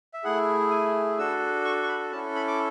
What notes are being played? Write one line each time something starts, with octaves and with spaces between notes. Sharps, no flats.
E5
A3 E4 G#4 F#5
G#5
D4 F#4 A4 E6
C#6
C#6
B5
C#4 E4 A4 A5
B5
D6